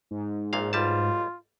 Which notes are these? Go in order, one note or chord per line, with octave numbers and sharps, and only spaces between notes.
G#2
A#1 A#2 F5
B1 G3 F4 A5